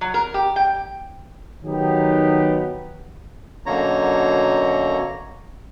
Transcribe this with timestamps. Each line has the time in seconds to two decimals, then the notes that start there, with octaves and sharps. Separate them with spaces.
0.01 F#3
0.14 A#4
0.34 G4
0.56 G5
1.64 D#3 F#3 B3 D#4 G4
3.66 F#2 B2 D3 A#3 C#5 A#5